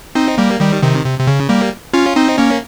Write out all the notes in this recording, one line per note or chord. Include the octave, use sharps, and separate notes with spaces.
C4 D#4
G3 A#3
D#3 G3
C3 D#3
C3
C3
C#3
G3 A#3
C#4 F4
C4 D#4
A#3 C#4